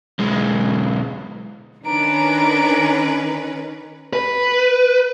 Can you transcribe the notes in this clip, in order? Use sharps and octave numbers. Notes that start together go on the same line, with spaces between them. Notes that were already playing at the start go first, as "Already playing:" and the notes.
B1 G#3
D#3 C#4 D4 B4 A#5 D7
B4